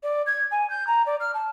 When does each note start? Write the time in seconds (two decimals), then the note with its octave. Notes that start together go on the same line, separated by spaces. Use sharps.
0.03 D5
0.26 G#6
0.51 G#5
0.70 G6
0.87 A#5
1.06 D5
1.20 F6
1.34 A5